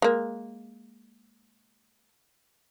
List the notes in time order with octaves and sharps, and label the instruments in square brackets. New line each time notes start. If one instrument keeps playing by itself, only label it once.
[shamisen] G#3 A#3